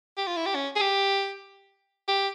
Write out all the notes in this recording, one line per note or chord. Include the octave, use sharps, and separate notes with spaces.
G4
F4
E4
G4
C#4
G#4
G4
G4